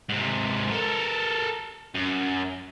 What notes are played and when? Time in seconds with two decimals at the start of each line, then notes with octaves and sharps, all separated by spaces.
0.09 G#2 C3
0.71 A4 A#4
1.94 F#2